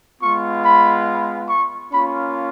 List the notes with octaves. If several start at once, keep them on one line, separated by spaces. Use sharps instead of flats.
G#3 B3 F4 C#6
B5
C#6
A#3 C#4 F4 B5